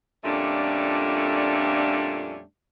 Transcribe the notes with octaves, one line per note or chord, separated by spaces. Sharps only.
F2 A#2 G3 A3 C#4 D4